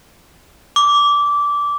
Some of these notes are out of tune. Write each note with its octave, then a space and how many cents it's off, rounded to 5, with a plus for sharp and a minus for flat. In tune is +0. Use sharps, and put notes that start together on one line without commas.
D6 -15